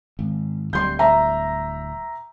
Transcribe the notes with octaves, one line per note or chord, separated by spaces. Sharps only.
G#1
D1 G3 C6 G6
E5 A#5